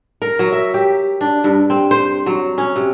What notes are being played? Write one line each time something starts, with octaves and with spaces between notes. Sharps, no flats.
A#4
F#3
E5
G4
D4
G2
C4
C5
F#3
C#4
C3